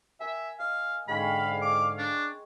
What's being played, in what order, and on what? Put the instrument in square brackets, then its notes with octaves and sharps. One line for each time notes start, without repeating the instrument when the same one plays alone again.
[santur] A#4 G#5 [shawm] E5
[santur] D#5 [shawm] F5
[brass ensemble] G#2 D3 F5 [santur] G#3 C#4 G5 [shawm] B5
[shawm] D6
[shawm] D4 [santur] C#5 A#5